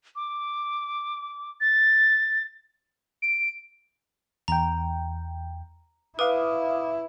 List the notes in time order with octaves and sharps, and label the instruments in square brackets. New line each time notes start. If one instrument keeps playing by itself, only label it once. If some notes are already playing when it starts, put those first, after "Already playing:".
[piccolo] D6
A6
[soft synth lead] D7
[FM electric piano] E2 G5 [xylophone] A#5
[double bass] E4 [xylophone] B4 [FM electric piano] F5 D6 D#6